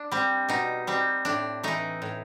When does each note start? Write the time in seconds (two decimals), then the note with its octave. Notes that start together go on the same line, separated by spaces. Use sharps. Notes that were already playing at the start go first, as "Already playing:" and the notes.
Already playing: D4
0.12 G3 C4
0.49 B2 D#4
0.87 G3 C4
1.25 A2 D4
1.63 E3 A3 D#4
2.02 A2